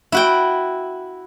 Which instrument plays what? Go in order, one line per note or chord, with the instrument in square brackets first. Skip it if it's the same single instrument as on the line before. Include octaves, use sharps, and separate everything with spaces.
[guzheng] E4 F#4 G5